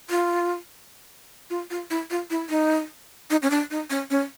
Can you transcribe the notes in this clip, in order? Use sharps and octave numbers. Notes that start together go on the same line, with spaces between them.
F4
F4
F4
E4
F4
E4
D#4
D#4
C#4
D4
D#4
C#4
C#4